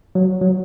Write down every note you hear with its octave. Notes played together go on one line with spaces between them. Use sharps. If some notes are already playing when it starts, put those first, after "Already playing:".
F#3
F#3